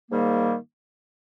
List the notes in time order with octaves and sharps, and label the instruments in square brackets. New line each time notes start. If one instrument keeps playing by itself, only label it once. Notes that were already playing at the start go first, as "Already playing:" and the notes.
[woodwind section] G#2 D#3 G3 A#3